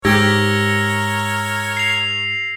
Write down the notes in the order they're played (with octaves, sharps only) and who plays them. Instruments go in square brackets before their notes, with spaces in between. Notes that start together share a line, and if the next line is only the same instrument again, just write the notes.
[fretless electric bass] G#2 [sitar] G4 [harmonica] A#4 C#5 [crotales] E6 G#6 A#6
[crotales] C7 F7